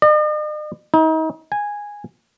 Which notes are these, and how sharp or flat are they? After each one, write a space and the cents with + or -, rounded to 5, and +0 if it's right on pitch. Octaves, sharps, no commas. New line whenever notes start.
D#5 -45
D#4 +35
G#5 -10